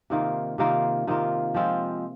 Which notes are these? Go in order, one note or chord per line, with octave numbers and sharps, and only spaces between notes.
C3 D#3 A#3 F4
C3 D#3 A#3 F4
C3 D#3 A#3 F4
F3 G#3 C4 F4